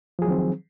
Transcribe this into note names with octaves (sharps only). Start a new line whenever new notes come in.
D#3 F3 F#3 C4 G#4